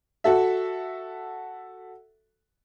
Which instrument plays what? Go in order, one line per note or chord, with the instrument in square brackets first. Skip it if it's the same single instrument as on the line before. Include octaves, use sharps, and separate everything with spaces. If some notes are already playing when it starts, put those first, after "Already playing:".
[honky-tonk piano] F#4 A4 E5